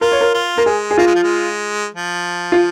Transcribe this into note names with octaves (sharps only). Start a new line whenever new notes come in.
F4 A#4
C#5
A#4
F4
A#3 A#4
G#3 G#4
G#4
A#3 F4
G#3
F3
G#3
F3
F4